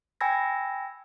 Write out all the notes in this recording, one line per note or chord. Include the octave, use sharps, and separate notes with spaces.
G5 G#5 B5 E6 G#6 A#6